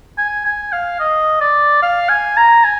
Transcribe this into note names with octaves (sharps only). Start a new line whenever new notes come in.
G#5
G#5
F5
D#5
D5
F5
G#5
A#5
G#5